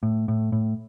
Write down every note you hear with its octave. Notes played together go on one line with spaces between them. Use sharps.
A2
A2
A2